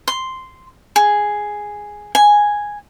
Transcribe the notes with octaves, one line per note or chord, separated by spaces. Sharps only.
C6
G#4
G#5